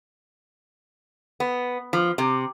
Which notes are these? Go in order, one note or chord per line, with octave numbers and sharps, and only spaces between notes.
B3
F3
C3